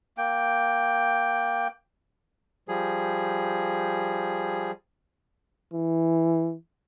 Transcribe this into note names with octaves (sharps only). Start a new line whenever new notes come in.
A#3 G5
F3 G3 G#4
E3